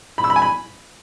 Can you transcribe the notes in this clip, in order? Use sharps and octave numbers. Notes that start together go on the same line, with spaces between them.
B5
E6
B5
G#5
B5